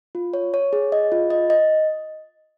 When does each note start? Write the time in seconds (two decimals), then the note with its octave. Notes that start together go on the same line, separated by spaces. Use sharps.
0.15 F4
0.34 C#5
0.54 C#5
0.73 G#4
0.92 D#5
1.12 F4
1.30 D#5
1.50 D#5